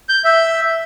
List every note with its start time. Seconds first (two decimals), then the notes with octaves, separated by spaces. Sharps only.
0.09 G6
0.24 E5